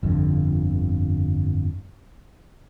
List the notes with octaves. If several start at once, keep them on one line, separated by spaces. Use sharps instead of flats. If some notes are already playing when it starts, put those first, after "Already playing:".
G1 F2 A#2 D3